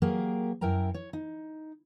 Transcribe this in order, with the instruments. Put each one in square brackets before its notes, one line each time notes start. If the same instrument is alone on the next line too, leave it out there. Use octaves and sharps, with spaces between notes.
[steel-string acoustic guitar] F#3 A#3 G4 G#4 A#4
F#2 E4 A#4 G5 A#5
C#5
D#4